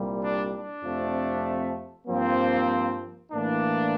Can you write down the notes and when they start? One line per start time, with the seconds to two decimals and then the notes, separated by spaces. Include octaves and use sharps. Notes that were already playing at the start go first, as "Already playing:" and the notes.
Already playing: C2 A#2 G3
0.21 D4
0.52 D4
0.83 F2 C3 F3 A3
2.07 G2 F3 A#3 C4
3.32 A2 E3 A#3 D4